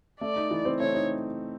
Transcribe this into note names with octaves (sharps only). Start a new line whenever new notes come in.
A3 D5
D#4
E3
C4
A3 C#5
D#4